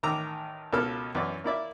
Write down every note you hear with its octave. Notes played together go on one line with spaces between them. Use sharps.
A1 D#3 A#5 D6 E6
C#2 B2 A#3 A4 F6
F#2 E3 D5
A#3 E4 D5 E5